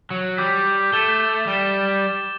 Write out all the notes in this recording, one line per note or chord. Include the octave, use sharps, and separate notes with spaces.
F#3
G3 D6 G6 B6
A3 A6 E7 G7
G3 A6 E7 G7